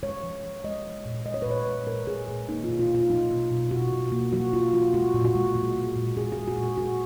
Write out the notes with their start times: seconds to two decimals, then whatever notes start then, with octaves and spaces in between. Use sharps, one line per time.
0.03 G#3 C#5
0.23 F3
0.44 F3
0.64 G#3 D#5
0.85 F3
1.06 A#2
1.26 G#3 D#5
1.34 C#5
1.42 B4
1.46 A#2 C#5
1.67 G#3
1.87 A#2 A#4
2.07 G#3 G#4
2.28 A#2
2.48 A#3 D#4
2.64 B2 F4
2.79 F4
2.90 B2 F4
3.10 F#3 D#4
3.30 B2
3.51 B2
3.71 B2 F#4
3.92 B2
4.12 A#3
4.33 F#3 F#4
4.53 F#3 F4
4.74 F#3 F4
4.94 G#3 F#4
5.14 A#2
5.25 F#4
5.35 G#3
5.56 G#3
5.76 G#3
5.96 A#2
6.17 A#2 G#4
6.32 G#4
6.37 G#3
6.48 F#4
6.58 A#2 G#4
6.78 G#3 F#4